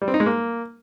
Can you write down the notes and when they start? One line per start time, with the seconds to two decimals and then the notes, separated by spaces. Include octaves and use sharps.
0.02 G3
0.08 C4
0.14 D#4
0.20 G#3
0.26 A#3